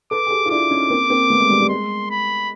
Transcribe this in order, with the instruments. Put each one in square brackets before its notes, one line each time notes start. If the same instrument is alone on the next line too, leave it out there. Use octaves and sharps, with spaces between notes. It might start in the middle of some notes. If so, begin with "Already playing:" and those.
[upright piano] A4 B4 [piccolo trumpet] D6
[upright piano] G#4
G4 A4
F4
[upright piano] D4 E4 [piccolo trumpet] D6
[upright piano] C#4 D#4
A#3 C4
A#3 C4
A3 B3
G#3
G3
G3
[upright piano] G#3 [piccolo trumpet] C6
[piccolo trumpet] B5